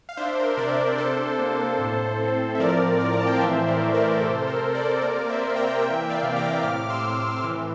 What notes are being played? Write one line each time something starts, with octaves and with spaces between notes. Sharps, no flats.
F5
D4 C5 E5
A#4
C5
C3 A#4 D5
D4 A4 C5
A#3
A2
C4
E5
F3 A#4 D5
A2 A#4 D5
A#5
A5
G5
F5
E3 C5 E5
A#4 D5
A3
A#4 D5
A#4
C3 A4 C5
A#4
C3
A#4 D5
A#3 A#4 D5
D5
C5 E5
A#3
G5 A#5
E3 E5 G5
D5 F5
C3
A#5 D6
A2 D6 F6
C6 E6
A2
E3